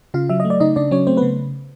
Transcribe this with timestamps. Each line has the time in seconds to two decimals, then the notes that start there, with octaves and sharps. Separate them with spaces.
0.14 C#3 F4 F5
0.29 F#3 E5
0.40 D#5
0.45 A3
0.50 D5
0.60 C#3 D#4 D#5
0.76 C#3 D4 D5
0.91 F#3 C#4 C#5
1.07 A3 C4 C5
1.17 B3 B4
1.22 C#3